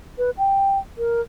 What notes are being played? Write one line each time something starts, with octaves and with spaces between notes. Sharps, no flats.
B4
G5
A#4